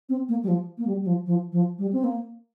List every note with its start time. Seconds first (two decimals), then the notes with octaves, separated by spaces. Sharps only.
0.09 C4
0.28 A#3
0.43 G3
0.48 F3
0.78 A#3
0.87 G3
1.02 G3
1.06 F3
1.26 F3
1.52 F3
1.78 G3
1.93 C4
2.04 A#3